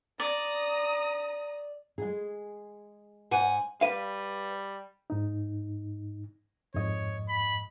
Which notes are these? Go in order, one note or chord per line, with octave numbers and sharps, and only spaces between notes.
D5 A#5 D#6
G#3 G#4
G#2 F#5 G#5
G3 B4 F5
G#2 D#4
F2 G#2 C#5 D#5
B5